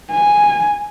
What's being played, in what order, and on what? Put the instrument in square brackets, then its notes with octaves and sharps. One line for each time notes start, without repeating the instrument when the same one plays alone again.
[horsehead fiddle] G#5